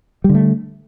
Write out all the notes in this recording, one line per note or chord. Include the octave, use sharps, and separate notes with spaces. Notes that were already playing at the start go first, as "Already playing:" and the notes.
D3 G3 A3